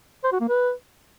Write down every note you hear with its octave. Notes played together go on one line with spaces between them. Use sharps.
C5
F#4
A#3
B4